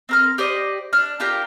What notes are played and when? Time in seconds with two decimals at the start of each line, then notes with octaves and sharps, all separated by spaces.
0.09 C4 A#4 F6
0.38 G4 C5 D5 D#5
0.93 D4 F6
1.20 D4 F4 G4 A#4